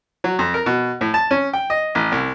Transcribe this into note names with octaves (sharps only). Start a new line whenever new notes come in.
F#3
F2
A#4
B2
A2
A5
C#4
G5
D#5
A1
C2